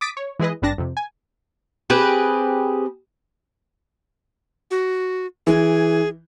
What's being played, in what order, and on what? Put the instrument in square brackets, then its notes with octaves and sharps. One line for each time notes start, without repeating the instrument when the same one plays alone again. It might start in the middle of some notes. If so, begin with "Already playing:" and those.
[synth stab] D6 D#6 A6 B6 D7
C#5
E3 G#3 E4 G#4 B4 D#5
G#1 G2 G3 D4 A5 A#6
F2 C3
G#5
[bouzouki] C4 G4 G#4 B4
[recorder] F#4
[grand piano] E3 [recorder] G#4